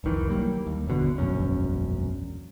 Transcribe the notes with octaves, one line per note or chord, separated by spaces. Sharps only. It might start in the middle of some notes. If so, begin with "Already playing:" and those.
F1 C2 D#3 E3
F#3 G3 A#3
D#2
G1 E2 B2 D3
E1 A#1 F#2 C#4